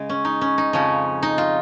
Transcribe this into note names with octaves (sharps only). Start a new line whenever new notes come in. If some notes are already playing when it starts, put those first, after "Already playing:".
Already playing: C#3 G#3
C#4
D#4
C#4
D#4
F2 C#3 F3 C#4
D#4
F4